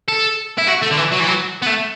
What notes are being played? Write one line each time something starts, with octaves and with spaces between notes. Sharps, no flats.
A4
E4
F#4
A3
D3
E3
F#3
E3
F#3
B3
A3